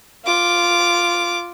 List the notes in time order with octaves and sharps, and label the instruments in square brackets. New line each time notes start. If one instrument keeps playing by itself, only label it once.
[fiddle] F4 D6